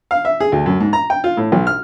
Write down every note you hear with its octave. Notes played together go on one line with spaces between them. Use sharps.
F5
E5
G#4
D2
F#2
G#2
A#5
G5
F4
A2
B1
F6